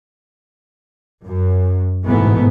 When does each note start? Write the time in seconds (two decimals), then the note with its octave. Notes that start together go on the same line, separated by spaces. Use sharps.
1.25 F#2
2.07 A1 G#2 B2 E3 A3 B3